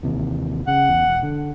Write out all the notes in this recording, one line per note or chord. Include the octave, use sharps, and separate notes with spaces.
D#2 C3 E3
C#3 F#5
E2
E1
D3